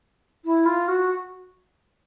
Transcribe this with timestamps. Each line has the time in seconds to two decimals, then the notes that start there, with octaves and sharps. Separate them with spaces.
0.45 E4
0.66 F4
0.88 F#4